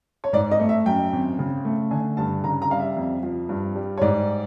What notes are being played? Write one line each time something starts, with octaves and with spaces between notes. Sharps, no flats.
C#5
G#2 D5
D#5
A3
E5
F#2 G5
G#1
C#3
A3
D3 G#5
G2 A5
C#3 A#5
A#5
G3 F5
E5
F2
F3
G2
G3
C#5
G#2 D5